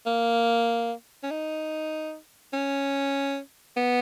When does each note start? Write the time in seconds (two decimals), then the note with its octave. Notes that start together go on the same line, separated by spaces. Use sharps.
0.06 A#3
1.23 C#4
1.31 D#4
2.53 C#4
3.77 B3